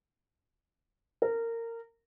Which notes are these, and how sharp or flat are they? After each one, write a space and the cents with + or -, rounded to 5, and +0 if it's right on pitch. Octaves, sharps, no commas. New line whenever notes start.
A#4 -20